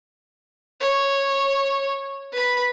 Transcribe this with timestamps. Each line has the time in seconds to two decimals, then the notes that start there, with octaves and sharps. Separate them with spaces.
0.80 C#5
2.33 B4 B5